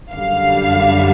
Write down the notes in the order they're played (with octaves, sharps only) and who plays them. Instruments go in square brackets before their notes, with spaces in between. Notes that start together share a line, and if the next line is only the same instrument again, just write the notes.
[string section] F#2 D3 G3 F5